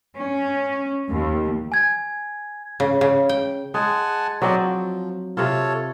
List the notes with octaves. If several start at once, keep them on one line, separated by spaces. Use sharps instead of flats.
C#4
D#2
G#5 G#6
C#3
C#3
G5
G#3 F#5 G#5 A5
F#3 C4 F#4 D5 D#5
F3
C3 F4 A4 C#5 A5